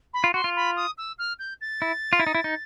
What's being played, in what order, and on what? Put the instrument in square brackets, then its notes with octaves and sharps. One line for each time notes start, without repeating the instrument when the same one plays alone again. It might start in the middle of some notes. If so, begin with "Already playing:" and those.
[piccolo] B5
[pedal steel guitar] F4
[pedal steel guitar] F#4 [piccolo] C6
[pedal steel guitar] F4
[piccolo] B5
D#6
E6
F6
G6
A6
[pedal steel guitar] E4
F4
E4
D#4
E4
D#4